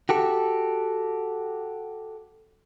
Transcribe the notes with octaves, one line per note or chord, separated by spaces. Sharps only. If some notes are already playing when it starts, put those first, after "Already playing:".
F#4 G4 A4